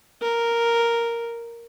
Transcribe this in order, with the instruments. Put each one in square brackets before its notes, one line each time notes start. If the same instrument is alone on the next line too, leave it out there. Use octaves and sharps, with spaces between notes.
[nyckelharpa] A#4